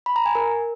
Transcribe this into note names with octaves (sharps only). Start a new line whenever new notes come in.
B5
A#5
G#5
A#4